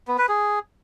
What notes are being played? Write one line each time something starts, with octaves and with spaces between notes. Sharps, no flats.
B3
B4
G#4